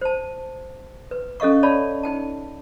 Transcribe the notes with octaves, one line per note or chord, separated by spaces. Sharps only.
C5 A5
B4
C#4 A4 D#5 F5 C#6
C#5 D5 F5 A5 B5
D#4 G5 A5